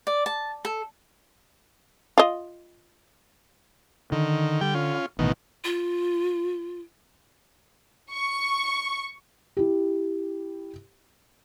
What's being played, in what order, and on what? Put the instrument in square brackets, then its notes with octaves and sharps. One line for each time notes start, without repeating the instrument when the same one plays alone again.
[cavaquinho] D5
A5
A4
[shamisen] F4 D#5
[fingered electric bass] D3 [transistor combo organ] D#3
[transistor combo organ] G3 G5
C#4 F4
[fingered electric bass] A1 [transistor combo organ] B2 D#3
[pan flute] F4
[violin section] C#6
[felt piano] E4 G4